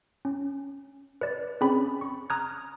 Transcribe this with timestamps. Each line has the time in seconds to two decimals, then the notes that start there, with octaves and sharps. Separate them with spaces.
0.25 C#4
1.21 B4 D5
1.61 C4 C#4 G#4 B5
2.01 C#6
2.30 A#5 D#6 F6 F#6 G#6